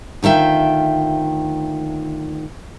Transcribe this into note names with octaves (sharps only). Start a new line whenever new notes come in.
D2 D#3 F4 E5 G5